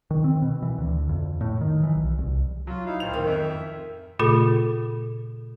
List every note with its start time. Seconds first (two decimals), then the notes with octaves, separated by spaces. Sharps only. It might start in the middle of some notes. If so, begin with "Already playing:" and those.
0.11 D#3
0.24 C4
0.42 B2
0.62 E3
0.78 D2
1.09 F2
1.41 A2
1.61 D#3
1.83 E3
1.96 B1
2.18 C2
2.67 F#3 F4
2.85 D#4 E4 F5
3.00 D1 C5 F7
3.13 D#3
3.27 F2 E5
4.19 A#2 C#3 A3 F4 A4